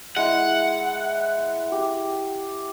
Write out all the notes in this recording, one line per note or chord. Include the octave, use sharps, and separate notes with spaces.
G#3 E4 F#5
G4